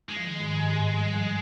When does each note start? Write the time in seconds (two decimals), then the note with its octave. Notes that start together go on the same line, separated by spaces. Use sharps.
0.09 G#3
0.17 F3
0.25 D#3
0.40 G#2
0.56 G2
0.72 G#2
0.93 G3
1.14 F3